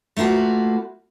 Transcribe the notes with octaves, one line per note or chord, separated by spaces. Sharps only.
A3 A#3 F4 F#4 B4